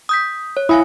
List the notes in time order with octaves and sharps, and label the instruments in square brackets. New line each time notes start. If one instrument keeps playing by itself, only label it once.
[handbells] D#6 G6 B6
C#5
[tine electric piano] E4 [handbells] F5 G#5 D#6